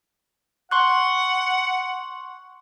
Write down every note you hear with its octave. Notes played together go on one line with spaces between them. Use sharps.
F#5 C6 C#6 F#6